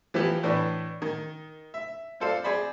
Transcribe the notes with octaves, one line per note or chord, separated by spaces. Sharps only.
E3 F3 B3 E4 G4
A2 E3 B3 D4
D#3
E5
C4 F4 A4 C5 D5 F5
C4 G#4 C5 D5 B5